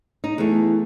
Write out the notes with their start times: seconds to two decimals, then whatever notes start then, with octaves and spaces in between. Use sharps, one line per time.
0.24 D#4
0.38 E2 A3